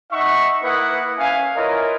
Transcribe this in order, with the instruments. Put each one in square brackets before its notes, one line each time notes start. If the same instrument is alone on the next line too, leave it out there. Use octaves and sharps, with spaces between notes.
[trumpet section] D#4 E5 F#5 C#6
A#3 E4 B4 F#5 D#6
C#4 E5 F5 G#5
E4 F4 A#4 B4 C#5 D#5